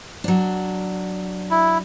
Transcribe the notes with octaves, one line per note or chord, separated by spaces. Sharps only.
F#3 D4
E4